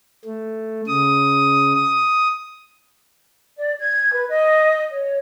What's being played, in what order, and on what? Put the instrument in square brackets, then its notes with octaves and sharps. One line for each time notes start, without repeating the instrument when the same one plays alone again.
[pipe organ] A3
C#3 D#6
D#6
[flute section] D5
G#6
B4
D#5
C#5